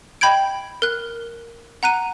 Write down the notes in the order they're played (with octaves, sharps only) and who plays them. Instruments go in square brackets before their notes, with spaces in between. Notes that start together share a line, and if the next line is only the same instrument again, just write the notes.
[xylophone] D#5 G5 B5 G6 G#6 D7
A#4 F#6
F#5 A#5 F#6 D#7